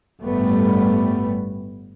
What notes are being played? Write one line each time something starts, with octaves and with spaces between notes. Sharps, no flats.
G1 A2 G3 A3 B3